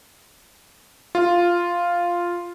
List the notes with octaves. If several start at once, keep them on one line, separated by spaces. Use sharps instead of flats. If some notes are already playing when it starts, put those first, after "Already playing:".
F4